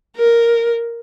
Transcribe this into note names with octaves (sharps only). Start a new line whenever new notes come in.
A#4